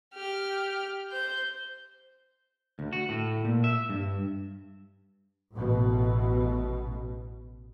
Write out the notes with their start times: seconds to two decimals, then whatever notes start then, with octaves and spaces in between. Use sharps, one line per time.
0.14 G4 F6
1.11 C5 G6
2.79 D2
2.93 F#4
3.09 A2
3.45 A#2
3.64 E5
3.89 G2
5.53 A1 B2